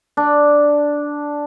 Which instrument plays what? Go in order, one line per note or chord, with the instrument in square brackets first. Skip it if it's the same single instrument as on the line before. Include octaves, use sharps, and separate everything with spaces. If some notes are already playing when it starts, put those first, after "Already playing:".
[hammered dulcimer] D4